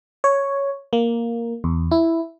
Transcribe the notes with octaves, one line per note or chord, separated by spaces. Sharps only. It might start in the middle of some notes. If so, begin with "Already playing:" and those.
C#5
A#3
E2
E4